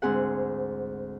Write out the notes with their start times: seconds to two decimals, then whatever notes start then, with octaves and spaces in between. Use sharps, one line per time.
0.02 D2 G#2 C4 G#4 F#5